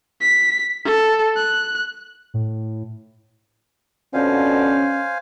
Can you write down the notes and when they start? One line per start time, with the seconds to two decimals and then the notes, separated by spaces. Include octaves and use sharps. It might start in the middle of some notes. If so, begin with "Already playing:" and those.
0.21 B6
0.85 A4
1.36 F#6
2.34 A2
4.14 F2 B2 D3 C#4 C5 F5 G#5